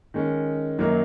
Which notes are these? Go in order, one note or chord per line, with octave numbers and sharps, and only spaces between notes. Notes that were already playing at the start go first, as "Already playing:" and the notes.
D#3 G#3 C#4
F#2 D#3 F#3 A#3